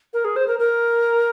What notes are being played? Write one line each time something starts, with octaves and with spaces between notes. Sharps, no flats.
A#4
G#4
C5
A#4
A#4